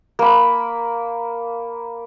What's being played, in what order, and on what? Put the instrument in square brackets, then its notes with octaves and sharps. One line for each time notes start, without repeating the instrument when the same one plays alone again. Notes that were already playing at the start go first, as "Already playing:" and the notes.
[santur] A#3 B5